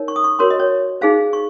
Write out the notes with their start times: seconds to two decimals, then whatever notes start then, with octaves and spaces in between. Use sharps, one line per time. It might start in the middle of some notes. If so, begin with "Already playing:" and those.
Already playing: D#4 A#4 C#5
0.08 C#6
0.16 D#6
0.24 C#6
0.39 F#4 A#4 C#5 C6
0.50 D#5
0.60 C#5
1.01 D#4 G#4 C5 F5
1.33 C#6